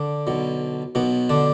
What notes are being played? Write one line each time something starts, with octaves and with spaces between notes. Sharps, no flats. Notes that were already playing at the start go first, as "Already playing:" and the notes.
Already playing: D3 D4
B1 B2
B1 B2 B3
D3 D4